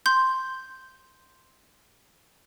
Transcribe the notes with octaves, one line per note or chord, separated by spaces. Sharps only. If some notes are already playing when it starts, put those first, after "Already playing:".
C6 G6